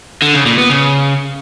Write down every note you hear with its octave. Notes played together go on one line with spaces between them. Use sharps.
D3
C#3
A#2
B3
C#3